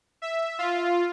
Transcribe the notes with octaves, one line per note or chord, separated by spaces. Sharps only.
E5
F4